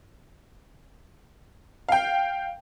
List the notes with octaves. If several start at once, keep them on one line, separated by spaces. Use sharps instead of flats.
F5 G5